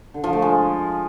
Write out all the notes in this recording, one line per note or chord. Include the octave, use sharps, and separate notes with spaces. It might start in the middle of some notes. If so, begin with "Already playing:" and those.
D3
F3
A3
G#3